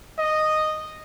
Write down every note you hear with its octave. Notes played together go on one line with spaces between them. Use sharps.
D#5